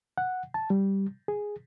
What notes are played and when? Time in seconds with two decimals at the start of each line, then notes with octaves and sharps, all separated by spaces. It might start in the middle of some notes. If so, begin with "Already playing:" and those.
0.18 F#5
0.54 A5
0.70 G3
1.28 G#4